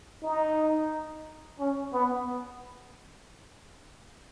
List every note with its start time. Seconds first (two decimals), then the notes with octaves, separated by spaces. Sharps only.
0.23 D#4
1.59 C#4
1.93 B3